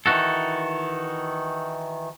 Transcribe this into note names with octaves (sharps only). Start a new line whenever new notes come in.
D#3 E3 F#4 A4